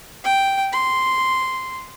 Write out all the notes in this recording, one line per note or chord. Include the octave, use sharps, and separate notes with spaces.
G5
C6